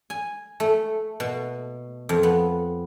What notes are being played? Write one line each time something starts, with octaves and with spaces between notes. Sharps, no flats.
G#5
A3
B2
F2
B3